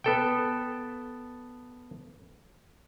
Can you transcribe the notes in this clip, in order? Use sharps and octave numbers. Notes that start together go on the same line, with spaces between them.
B3 A4 G5